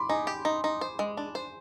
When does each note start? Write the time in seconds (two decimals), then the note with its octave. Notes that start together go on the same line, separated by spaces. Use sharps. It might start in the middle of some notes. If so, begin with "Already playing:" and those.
Already playing: B5 C6 D6
0.09 D#4 G#5
0.27 G4
0.45 D#4
0.64 D#4
0.81 C5
0.99 G#3
1.17 D4
1.35 C5